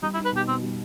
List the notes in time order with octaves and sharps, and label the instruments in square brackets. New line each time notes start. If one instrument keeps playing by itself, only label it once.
[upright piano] G3 [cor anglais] D#4
[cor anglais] E4
[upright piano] D#4
[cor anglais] B4
[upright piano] B2 [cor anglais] G4
[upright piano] B2 [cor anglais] C4
[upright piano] G3